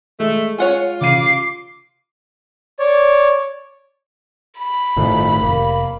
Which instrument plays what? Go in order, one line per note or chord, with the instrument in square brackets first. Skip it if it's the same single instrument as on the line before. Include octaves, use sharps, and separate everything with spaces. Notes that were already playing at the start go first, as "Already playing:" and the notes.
[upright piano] G#3 [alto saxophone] A3
[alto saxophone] F4 [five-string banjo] C#5 F#5 G#5
[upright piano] C#3 F5 D#7 [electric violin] D6 C7
[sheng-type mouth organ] C#5 D5
[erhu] B5
[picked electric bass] G1 A2 D#3 [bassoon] F2
[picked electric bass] F1 [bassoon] A#3